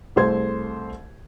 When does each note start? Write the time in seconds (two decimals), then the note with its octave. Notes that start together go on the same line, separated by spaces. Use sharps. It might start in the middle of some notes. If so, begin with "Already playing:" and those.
0.16 C2 A3 G#4 C5 C6 G#6